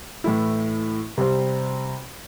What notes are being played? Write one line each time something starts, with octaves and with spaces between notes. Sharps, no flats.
A2 E3 A3 E4
C3 G3 C4